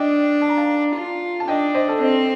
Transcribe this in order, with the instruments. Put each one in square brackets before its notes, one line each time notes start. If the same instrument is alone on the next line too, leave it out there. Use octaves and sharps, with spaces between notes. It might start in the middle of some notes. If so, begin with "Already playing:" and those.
Already playing: [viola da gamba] D4 [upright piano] D5 D#5 G5
[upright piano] A5
A#5
F5 A5
[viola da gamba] F4
[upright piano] A5
[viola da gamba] D4 [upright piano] D#5 G5
[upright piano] C5 D#5
A4 C5
[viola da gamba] C4 [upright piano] C5 D#5